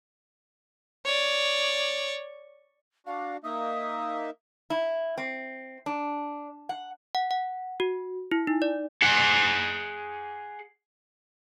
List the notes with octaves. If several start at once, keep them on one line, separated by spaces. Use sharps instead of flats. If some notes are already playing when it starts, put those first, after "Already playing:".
C#5 D5
D4 F#4 F5
A#3 D#4 E5 D#6
E4
C4
D4
F#5
F#5
F#5
F#4
E4
D#4
D5
G#4 F#5